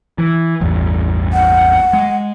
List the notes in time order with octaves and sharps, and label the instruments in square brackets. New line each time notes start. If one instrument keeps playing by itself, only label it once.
[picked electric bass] E3
A1 E2 G2
[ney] F#5
[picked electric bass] G#3